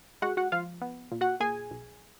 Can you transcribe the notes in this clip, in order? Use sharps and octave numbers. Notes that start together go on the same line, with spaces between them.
G#3 F#4 F#5
F#4 F#5
F3 F4 F5
B3
A#2
F#4 F#5
A#2 G#4 G#5
B1